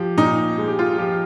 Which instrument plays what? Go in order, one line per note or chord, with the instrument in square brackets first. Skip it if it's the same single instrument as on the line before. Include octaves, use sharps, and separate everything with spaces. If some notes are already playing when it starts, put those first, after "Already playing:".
Already playing: [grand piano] F3 G4
A#2 D#4
G#3
G4
F4
F3 G4